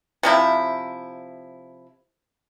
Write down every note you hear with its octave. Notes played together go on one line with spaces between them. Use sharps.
C3 F3 E4